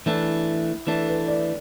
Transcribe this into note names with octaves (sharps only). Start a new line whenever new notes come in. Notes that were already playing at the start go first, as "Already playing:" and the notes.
E3 A3 D4 E4
E3 A3 D4 A4
B4
D5